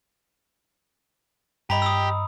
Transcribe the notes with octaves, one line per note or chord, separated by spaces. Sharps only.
G2 G4 D#5 A#5 B5
D#6 E6